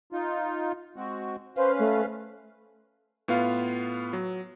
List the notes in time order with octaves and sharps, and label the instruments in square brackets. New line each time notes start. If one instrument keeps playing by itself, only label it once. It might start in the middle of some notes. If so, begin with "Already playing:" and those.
[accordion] D#4 F4
G#3 C4 F#4
[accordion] C#4 B4 F5 [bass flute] C5
[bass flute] A3
[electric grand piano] A2 B3 F4 F5
F#3